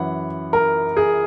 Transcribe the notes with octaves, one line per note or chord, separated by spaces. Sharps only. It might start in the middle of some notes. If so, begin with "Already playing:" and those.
Already playing: F#2 E3 F#5
A#4
G#4